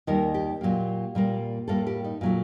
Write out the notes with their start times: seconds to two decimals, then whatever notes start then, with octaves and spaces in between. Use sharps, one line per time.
0.07 D#2 D#3 G3 A#4
0.34 G4
0.61 A#2 F#3 A#3
1.15 A#2 G3 A#3
1.68 A2 G3 A#3 A4
1.87 G4
2.04 D#4
2.21 A#2 F#3 A3